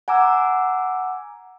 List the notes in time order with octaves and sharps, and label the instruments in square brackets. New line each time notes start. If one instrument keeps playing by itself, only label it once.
[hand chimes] F#5 G#5 A#5 D6 E6